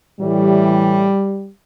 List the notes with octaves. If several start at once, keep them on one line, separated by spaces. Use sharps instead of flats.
A2 E3 G3